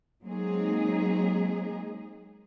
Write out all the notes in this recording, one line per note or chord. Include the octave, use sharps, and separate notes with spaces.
F#3 G#3 A#3 C4 D#4 G#4